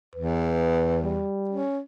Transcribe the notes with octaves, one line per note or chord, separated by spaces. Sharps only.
E2 B4
G3
C#4